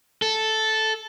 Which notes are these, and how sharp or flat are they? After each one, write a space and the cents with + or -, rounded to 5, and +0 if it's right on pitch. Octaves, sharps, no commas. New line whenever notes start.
A4 -5